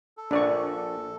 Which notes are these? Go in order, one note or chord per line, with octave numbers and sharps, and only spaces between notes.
A4
A#1 D4 D5 C#6